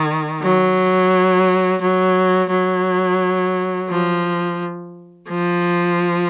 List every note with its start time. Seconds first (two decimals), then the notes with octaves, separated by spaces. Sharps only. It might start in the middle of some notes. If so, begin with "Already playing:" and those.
Already playing: D#3
0.42 F#3
1.81 F#3
2.50 F#3
3.89 F3
5.29 F3